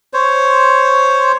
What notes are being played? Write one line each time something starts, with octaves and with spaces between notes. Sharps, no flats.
C5 C#5